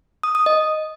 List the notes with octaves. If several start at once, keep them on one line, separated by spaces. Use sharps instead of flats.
D#6
D#6
D#5